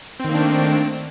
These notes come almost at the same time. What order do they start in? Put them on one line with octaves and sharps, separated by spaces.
C4 D#3 A#3 D4 A3